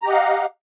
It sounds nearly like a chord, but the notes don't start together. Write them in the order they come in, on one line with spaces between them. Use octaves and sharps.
A#5 G4 D#5 F#5 F5